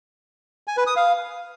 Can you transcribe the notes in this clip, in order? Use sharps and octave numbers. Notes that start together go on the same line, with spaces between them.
G#5
B4
D#6
F5